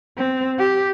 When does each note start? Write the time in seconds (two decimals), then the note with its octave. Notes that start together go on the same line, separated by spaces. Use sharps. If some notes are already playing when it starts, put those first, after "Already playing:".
0.18 C4
0.59 G4